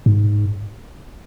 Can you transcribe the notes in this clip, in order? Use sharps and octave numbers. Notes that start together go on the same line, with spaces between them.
G#2